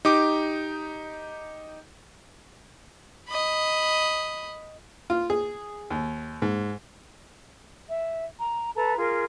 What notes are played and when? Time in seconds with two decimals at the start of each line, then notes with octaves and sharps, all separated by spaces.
0.05 D#4 G4 D6
3.29 D#5 B5
5.10 F4
5.30 G#4
5.90 D#2
6.42 G#2
7.88 E5
8.40 A#5
8.75 A4 B4 A5 A#5
8.98 F4 G#4 A#4